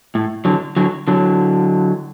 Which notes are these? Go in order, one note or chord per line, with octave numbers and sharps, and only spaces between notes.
A2
D3 F#3
D3 F#3
D3 F#3